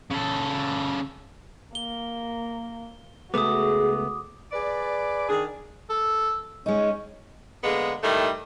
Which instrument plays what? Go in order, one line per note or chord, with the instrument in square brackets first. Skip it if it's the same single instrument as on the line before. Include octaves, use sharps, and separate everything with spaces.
[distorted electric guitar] C#3 A4
[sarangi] A#3 [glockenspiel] G7
[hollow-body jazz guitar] C#2 A3 B3 [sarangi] F#4 [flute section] G#4 [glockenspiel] D6 D#6
[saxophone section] G#4 B4 D5
D#3 D4 G#4
[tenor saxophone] A4
[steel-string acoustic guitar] G#3 D#4 [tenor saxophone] C#4
[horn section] D3 G#3 A#3 B3
A2 D#3 G3 A3